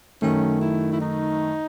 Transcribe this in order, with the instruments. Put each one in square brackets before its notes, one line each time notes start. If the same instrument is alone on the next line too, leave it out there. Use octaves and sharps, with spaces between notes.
[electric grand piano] F#2 D#3 A3 [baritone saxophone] C#4
[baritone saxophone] E4
E4
D#4